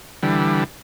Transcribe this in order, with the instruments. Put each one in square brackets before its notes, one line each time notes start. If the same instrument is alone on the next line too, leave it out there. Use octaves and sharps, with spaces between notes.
[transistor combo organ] D3 E3 G3